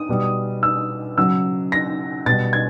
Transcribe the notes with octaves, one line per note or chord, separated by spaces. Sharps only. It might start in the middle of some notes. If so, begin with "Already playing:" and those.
Already playing: D#6
B2 G3
E6
C#3 F#3 E6
A#6
B2 G3 A6
G#6